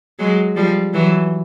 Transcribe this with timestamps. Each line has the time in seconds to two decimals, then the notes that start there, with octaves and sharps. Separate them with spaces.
0.19 F#3 G#3
0.56 F3 G3
0.93 E3 F#3